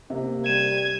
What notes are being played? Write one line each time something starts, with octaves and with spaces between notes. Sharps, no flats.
C3 A#3
G3 G#6 D#7 E7